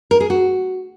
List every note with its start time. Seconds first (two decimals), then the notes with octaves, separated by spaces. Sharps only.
0.11 A#4
0.20 G#4
0.30 F#4